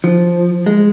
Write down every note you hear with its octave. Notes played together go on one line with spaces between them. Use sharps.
F3
G#3